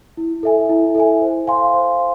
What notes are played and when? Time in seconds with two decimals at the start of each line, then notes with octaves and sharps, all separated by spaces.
0.17 E4
0.43 A4 E5 G#5
0.69 E4
0.95 A4 E5 G#5
1.21 C5
1.47 F5 G#5 C6
1.73 C5
1.99 F5